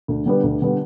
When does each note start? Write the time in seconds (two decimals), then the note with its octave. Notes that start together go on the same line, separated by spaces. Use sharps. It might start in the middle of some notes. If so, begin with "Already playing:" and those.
0.08 D2
0.26 D3 G3 B3
0.43 D2
0.62 D3 G3 B3